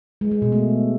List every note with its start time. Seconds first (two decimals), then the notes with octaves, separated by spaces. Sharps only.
0.21 G#3
0.32 G#3
0.42 B2
0.52 A3